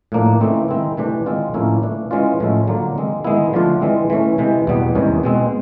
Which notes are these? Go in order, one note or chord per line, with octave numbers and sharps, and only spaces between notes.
A2 F3 A#3 D4
C#3 E3 A3 C4 D#4
D#3 G#3 C4 E4
C3 E3 A3 D4
D#3 G#3 C4 F4
A2 F3 A#3 C#4 E4
E3 A3 D4
E3 G#3 C#4 F4
A2 F3 G#3 C#4 E4
D3 F#3 A#3 D4 F4
D#3 G#3 C4
D#3 G#3 B3 E4
D3 F3 A3 D4 F4
E3 G#3 C4
E3 A3 C#4
C3 E3 G#3
E2 B2 G3 B3
E2 C3 D#3 G#3 C#4
B2 G#3 C4